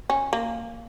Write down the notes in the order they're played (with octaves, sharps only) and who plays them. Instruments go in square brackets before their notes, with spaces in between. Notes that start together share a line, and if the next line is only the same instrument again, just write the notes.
[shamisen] C#4
A#3